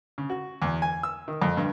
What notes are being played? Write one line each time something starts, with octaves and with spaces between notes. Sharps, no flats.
C#3
F#4
E2
G#5
E6
D#3
F2
G2